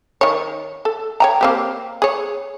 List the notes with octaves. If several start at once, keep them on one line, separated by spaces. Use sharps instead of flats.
D#3 C#5
A4
C#5 G5 A#5
A#3 C4 G4
G#4 C#5